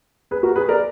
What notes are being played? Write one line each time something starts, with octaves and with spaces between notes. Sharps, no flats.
G#4 B4
F#4 A#4
G#4 B4
A#4 D5